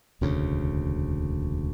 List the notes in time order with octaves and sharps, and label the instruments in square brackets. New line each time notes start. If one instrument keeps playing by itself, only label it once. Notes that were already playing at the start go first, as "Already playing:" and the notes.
[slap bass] E1 D2 C#3